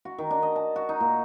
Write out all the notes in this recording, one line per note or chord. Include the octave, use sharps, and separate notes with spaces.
F#4
D#3
D4
D#5
A5
F#4
D#4
A#2